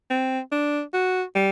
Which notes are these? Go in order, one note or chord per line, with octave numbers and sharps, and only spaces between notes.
C4
D4
F#4
G3